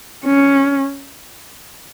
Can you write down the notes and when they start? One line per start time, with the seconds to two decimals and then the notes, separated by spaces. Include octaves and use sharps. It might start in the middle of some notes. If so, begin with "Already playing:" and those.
0.25 C#4